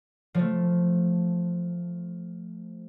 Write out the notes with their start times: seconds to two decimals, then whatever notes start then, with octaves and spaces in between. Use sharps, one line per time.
0.34 F3 A3